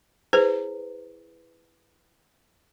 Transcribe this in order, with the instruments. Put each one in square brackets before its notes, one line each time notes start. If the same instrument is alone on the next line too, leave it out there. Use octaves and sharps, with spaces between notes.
[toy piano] E4 B4 [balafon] G#4 C5